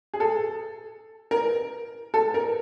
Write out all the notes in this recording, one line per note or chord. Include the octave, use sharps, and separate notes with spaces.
G#4
A4
A#4
A4
A#4